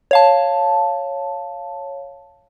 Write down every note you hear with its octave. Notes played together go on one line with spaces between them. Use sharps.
C#5 F5 A5